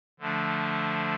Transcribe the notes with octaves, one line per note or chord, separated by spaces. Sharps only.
D3 F3 A3 D4